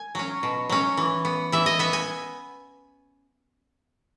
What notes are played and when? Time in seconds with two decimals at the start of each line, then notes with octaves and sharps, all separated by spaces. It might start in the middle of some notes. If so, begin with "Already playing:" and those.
Already playing: G#5
0.15 F#3 C#4
0.43 B2
0.69 F#3 C#4
0.97 E3
1.25 B3
1.52 E3 E5
1.66 D#5
1.79 B3 E5
1.93 G#5